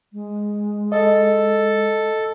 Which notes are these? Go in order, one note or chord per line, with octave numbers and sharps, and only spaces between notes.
G#3
A4 D#5